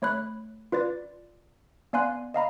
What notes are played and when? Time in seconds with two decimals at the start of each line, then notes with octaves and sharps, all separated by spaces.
0.02 A3 C#5 B5 F#6
0.72 F4 B4 D5 A6
1.93 B3 D5 F5 G#5 C6 F#6
2.34 D#5 F5 A#5 B5